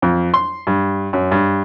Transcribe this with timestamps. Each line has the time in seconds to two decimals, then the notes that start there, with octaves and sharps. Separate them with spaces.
0.02 F2
0.34 C6
0.67 G2
1.13 F#2
1.32 G2